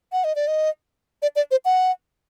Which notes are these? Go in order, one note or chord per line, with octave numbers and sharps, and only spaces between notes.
F#5
D#5
D5
D#5
D5
D5
C5
F#5